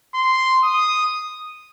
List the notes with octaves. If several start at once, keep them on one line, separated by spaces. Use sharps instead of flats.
C6
D#6